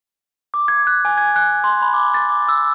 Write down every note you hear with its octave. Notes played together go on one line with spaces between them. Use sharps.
D6
G#6
F#6
G#5
G#6
F#6
C6
B5
D6
A6
D6
E6